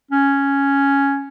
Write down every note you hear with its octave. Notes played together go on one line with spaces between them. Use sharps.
C#4